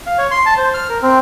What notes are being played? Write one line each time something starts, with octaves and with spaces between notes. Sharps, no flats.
F5
C#5
C6
A5
C5
F6
A#4
C4